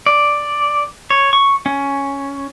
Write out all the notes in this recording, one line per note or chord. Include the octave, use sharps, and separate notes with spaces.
D5
C#5
C#6
C#4